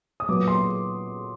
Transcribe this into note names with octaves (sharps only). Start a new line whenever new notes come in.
D#6
A#2 F#3 B3 D6
C6